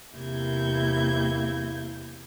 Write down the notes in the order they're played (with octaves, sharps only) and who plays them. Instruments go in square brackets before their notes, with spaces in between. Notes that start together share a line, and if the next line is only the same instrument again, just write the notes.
[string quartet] E2 C3 A#3 E4 G6 G#6